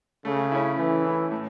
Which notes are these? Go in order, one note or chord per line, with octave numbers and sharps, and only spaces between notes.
C#3 A3
C#4 E4
E3 A3
C#4 E4
A2